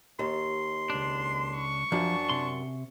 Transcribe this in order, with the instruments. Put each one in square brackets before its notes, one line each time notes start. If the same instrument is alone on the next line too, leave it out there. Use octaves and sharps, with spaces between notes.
[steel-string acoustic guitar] D#2 [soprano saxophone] C6
[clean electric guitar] C#2 D4
[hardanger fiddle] C#6
[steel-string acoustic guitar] F#2 [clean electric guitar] F3 [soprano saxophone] D4
[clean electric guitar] C3 C6